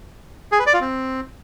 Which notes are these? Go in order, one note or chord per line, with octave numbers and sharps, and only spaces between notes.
G#4
B4
D5
F4
C4